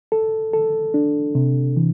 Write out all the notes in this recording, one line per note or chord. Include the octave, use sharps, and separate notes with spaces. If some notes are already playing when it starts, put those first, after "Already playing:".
A4
A4
D4
C3
E3